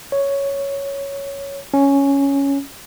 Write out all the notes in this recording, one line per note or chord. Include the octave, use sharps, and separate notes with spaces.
C#5
C#4